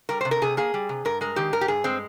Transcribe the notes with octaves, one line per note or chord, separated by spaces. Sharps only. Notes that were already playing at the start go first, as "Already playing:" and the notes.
G3 A#4
C3 C5
A#4
C3 G#4
A#3 G#4
G3
C3
G2 A#4
G#3 A#4
D#3 G4
G2 A#4
G4
G2 G#4
G#3 C4